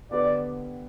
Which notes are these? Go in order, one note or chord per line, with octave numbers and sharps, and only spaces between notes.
D3 B3 G4 B4 D5